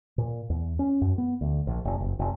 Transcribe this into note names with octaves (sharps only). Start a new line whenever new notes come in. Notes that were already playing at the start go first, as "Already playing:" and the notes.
A#2
E2
C#4
F#2
B3
D2
A#1
F1
F#1
F1